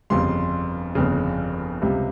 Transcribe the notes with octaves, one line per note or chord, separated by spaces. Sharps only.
G1 F2 C#3 G3 C6
G1 F2 C#3
C#2 C3 G3